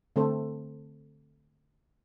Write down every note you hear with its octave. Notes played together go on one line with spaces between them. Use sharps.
D3 A3 C4 A4 C5